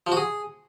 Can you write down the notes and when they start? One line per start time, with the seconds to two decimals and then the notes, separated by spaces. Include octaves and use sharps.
0.07 F3
0.12 F#4
0.17 G#4